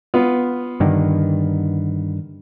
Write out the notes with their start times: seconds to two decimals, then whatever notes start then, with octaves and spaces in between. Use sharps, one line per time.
0.14 B3 F4
0.80 G2 D3 D#3